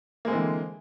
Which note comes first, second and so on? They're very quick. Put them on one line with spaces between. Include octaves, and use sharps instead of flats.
A#3 G#3 C4 E3 D3